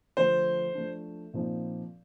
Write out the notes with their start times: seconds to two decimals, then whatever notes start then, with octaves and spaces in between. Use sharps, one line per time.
0.17 D3 F3 A3 C5
0.75 F3 A3 D4
1.33 A#2 F3 C4 D#4